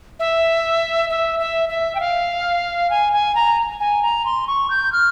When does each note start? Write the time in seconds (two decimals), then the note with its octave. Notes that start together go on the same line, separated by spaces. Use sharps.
0.19 E5
1.10 E5
1.39 E5
1.69 E5
1.95 G5
2.00 F5
2.90 G#5
3.13 G#5
3.35 A#5
3.80 G#5
4.03 A#5
4.25 C6
4.48 C#6
4.70 G6
4.92 F6